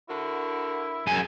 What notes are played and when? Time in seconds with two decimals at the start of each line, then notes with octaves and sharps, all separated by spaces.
0.09 D3 E4 F#4 A#4
1.07 F#2 G#4 G#5